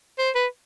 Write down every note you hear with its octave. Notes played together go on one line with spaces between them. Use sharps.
C5
B4